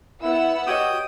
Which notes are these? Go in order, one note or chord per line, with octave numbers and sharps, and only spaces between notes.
B3 E4 F#5 E6
F#4 G4 C#5 D#5 G5 D#6